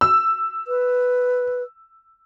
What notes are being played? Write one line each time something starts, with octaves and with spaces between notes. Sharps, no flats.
E6
B4